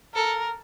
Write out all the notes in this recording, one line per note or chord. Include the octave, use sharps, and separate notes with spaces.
A4 A#4